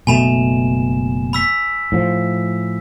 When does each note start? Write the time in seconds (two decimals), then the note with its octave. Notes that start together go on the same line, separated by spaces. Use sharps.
0.07 F#1 B2 A3 G#5 B5 E7
1.33 B5 E6 B6
1.92 A2 F3